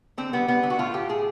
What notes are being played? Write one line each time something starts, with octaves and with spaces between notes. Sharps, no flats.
D3 C4
G3 B3
G3 B3
D3
F#4
A2 F4
A2 G4
A2 G#4